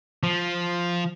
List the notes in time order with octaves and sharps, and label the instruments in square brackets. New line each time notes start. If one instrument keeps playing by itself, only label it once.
[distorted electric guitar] F3